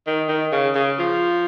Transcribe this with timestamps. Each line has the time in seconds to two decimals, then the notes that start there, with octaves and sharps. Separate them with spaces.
0.07 D#3
0.28 D#3
0.52 C#3
0.75 C#3
0.98 F3